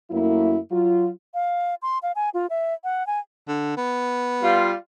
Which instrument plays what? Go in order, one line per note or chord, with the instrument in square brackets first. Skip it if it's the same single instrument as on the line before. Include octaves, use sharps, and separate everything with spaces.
[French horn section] F#2 F#3 A3 A#3 E4
F#3 F4
[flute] F5
C6
F5
G#5
F4
E5
F#5
G#5
[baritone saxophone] D3
B3
[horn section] G3 F4